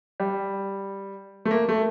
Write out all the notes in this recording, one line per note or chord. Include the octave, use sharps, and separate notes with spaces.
G3
A3
A#3
A3